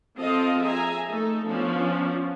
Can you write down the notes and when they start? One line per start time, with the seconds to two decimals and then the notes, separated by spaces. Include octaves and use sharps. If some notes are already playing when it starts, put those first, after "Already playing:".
0.18 F3 C4 F4 A4 D#5 F5
0.61 G#4 E5 G#5 A#5
1.09 A3 D#4 A4
1.47 F3 B3 C#4 D4